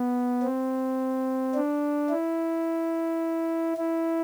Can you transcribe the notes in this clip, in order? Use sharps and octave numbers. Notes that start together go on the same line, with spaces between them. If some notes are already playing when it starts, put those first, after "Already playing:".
Already playing: B3
C4
D4
E4
E4